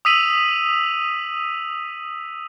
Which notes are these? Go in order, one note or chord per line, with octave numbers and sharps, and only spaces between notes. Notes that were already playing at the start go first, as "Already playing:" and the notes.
D#6 E6 B6 D#7 F7 F#7